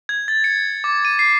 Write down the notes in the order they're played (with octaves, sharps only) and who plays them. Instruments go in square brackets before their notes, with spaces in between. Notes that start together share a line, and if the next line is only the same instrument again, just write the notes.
[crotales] G#6
A6
C#7
D6
D#7
C7